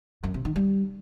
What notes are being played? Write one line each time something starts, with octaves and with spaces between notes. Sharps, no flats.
F#2
C3
D#3
G3